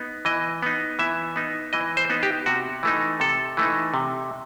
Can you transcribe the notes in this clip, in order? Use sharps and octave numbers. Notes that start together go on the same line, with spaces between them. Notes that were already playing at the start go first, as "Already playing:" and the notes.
Already playing: B3 D#4
E3 D#5
B3 D#4
E3 E5
B3 D#4
E3 D#5
C5
B3 D#4
G4
C3 F#4
E3 A3 D#4
C3 A4
E3 A3 D#4
C3